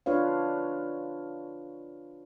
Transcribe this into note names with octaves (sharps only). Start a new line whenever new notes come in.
D4 F4 B4 C#5 F5